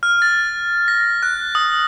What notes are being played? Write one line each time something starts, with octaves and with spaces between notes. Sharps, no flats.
F6
A6
A#6
F#6
D#6